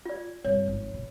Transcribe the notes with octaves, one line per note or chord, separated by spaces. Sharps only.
F4 D5
G2 C3 C#5
G#1 F3
B2